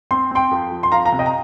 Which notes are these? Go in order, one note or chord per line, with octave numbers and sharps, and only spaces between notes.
C4 C6
C4 G5 C6
F2
F3
C6
F2 F5 A#5
F5 A#5
C3
D#5 G5
A#5